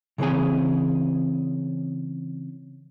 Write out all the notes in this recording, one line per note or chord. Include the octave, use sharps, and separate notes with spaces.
C#3 E3 C4 G#4 G#5